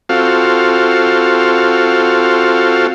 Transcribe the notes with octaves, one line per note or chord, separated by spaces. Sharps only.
C4 F4 F#4 A4 F5